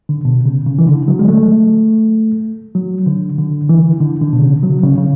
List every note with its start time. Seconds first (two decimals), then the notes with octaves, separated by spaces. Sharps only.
0.09 D3
0.25 B2
0.45 C#3
0.67 C#3
0.79 E3
0.87 D3
1.08 F#3
1.19 G#3
1.28 A3
2.75 F#3
3.06 D3
3.38 D3
3.69 E3
4.00 D3
4.21 D3
4.33 B2
4.42 C#3
4.63 F#3
4.84 C#3
4.98 C#3